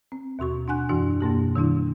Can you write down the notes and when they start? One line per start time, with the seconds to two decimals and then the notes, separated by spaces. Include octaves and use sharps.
0.12 C4
0.39 D#2 B2 F#4 C#6
0.68 D4 F#5 G#5 F#6
0.89 F#2 E3 D4 F#4
1.21 F#2 B2 A#3 G4
1.56 D#3 G3 D4 E4